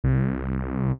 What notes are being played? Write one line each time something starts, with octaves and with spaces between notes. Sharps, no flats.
C2